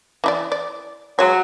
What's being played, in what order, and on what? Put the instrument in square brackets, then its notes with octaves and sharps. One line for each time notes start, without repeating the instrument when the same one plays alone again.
[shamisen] E3 E4 D5
D5
[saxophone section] F#3 [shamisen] G#3 C#5